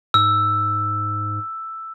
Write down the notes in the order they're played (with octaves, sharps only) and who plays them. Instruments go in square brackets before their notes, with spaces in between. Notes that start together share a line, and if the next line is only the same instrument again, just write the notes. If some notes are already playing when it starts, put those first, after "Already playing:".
[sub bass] G#2 [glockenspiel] E6